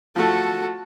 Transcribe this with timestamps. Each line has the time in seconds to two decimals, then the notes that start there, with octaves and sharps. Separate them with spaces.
0.16 F3 A3 F#4 A4